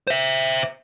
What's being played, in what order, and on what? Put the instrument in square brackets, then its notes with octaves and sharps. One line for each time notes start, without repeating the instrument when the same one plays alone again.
[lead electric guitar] C5 E5